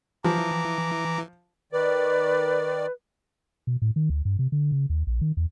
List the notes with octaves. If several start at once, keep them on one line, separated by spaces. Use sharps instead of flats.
E3 F3 A#5 D6
D#3 B4 D5
B2
A2
D#3
D2
G2
C3
D3
C#3
D#2
A#1
D#3
E2